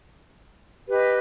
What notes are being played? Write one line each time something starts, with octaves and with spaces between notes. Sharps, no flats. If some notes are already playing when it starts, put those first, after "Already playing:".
G4 B4 D#5